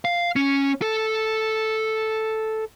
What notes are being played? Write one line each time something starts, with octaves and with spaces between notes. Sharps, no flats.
F5
C#4
A4